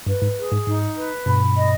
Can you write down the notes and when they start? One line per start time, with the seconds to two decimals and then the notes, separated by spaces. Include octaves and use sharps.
0.07 G2 B4
0.22 G#2
0.37 G#4
0.52 G#2
0.66 G#2 D#4
0.97 B4
1.26 G2 B2 B5
1.57 D#5